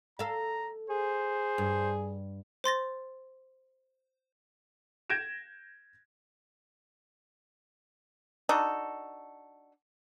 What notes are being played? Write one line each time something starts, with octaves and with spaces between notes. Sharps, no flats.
A4 F5 A#5
G#4 C5
G2
C5 C6 A6 A#6
G6 G#6 A#6 D7 E7
D4 D#4 F#4 A4